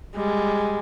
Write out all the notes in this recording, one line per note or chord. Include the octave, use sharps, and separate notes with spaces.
G3 G#3